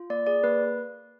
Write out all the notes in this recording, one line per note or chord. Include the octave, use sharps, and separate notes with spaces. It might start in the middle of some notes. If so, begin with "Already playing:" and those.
Already playing: F4
A#3 D5
G#4 D5
A#3 B4